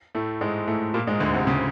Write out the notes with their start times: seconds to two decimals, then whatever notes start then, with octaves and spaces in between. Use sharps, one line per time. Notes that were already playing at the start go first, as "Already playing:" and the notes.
0.15 A2 A3
0.41 G#2 G#3
0.68 A2 A3
0.94 A#2 A#3
1.07 G#2 G#3
1.20 D2 D3
1.34 C3
1.47 C#3